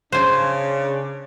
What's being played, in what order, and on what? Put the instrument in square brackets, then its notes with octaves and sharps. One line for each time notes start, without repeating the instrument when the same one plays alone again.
[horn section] C#3 D4 [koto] C5 G#5